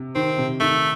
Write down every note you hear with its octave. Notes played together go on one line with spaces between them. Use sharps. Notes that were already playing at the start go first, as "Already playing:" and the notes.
Already playing: C3
D#3 C4
C3
D#3 A3